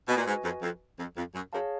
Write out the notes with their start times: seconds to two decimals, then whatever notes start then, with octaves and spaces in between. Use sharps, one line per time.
0.08 B2 F#4 B4 D#5 G#5
0.17 A#2
0.26 G#2
0.43 F2
0.62 F2
0.98 F2
1.16 F2
1.34 F#2
1.53 F#2 G#4 C#5 F5 A5